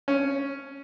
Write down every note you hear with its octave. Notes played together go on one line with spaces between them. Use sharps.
C#4